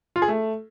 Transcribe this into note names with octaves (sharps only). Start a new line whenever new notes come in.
F4
G#4
A3